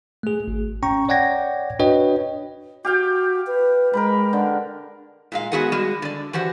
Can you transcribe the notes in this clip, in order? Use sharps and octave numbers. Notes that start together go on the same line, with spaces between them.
A3 G#4
G#1
C#4 G5 A#5 C#6
C#5 D5 F#5 G5 G#6 A#6
D4 F#4 B4 C#5 D#5 G5
F#4 G4 F5 G5
B4
G#3 A#4 B4 B5
D3
A#2 G#3 F5
G#3 B3 F#4 G#4 A#4 F#5
G3 G#3 F#4
D3 D5
E3 F#4 G4 C5 F#5